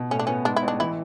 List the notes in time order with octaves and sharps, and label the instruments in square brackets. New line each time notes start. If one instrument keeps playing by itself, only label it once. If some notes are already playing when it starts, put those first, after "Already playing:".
Already playing: [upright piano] B2
[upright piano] A2 [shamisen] C#4
[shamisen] D4
[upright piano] B3 [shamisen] C#4
[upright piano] G#2 [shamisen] D4
[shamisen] E4
[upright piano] A1
[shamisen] D4
[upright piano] E3 [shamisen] E4